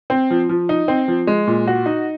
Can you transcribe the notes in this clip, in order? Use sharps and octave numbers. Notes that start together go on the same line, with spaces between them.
C4
F3
F3
D#4
C4
F3
G#3
A#2
F#4
D#4